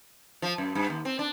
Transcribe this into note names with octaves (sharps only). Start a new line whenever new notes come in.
F3
F#2
G2
D#2
C4
D4